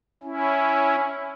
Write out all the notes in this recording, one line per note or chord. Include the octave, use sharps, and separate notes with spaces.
C#4 E4